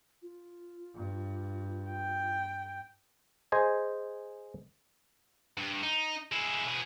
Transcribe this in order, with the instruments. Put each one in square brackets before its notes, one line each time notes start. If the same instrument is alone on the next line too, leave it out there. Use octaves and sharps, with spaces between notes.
[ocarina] F4
[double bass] G2
[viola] G5
[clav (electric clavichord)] G#4 C5 D#5 G#5
[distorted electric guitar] G2
D#4
G#3 E4
B2 G#4